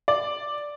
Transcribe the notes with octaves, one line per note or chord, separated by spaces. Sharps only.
D5